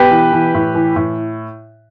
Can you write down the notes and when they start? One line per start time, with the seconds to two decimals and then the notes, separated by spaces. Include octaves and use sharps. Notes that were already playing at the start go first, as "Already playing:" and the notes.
Already playing: B2 G4 B4
0.11 E3
0.33 E3
0.54 A2
0.75 E3
0.96 A2